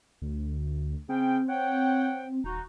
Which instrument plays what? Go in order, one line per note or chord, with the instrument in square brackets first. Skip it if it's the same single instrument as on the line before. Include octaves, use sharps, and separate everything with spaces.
[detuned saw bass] D2
[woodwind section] C#3 C#4 G5 [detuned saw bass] C4
[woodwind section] C#5 F#5 G5
[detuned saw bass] D#1 [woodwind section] D#4 F#4